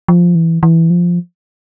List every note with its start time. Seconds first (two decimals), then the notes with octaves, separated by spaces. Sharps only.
0.08 F3
0.35 E3
0.63 E3
0.90 F3